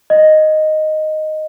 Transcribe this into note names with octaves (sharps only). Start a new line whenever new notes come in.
D#5